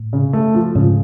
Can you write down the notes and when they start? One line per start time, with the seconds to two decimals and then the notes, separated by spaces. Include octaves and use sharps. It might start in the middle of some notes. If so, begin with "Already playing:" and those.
Already playing: A2
0.13 C#3
0.33 A3
0.55 F3
0.75 G#2 C#3